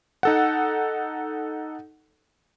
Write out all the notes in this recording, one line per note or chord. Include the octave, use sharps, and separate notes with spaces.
D#4 A4 F#5